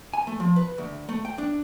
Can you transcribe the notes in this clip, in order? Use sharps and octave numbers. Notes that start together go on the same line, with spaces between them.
G#5
A3
F3
B4
D2
A3
G5
D4